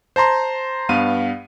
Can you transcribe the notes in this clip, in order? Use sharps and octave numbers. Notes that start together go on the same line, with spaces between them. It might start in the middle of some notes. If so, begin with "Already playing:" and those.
C5 A5 A#5 C6
G2 B3 F5 D#7